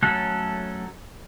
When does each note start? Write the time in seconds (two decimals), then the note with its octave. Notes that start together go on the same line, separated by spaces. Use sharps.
0.03 F#3 A3 C#4 A4 F#6